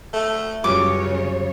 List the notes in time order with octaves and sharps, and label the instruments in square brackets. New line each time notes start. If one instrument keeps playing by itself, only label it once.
[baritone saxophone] A3
[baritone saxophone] C#2 [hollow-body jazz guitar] F#2 G3 [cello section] C#3 C#5 [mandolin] D6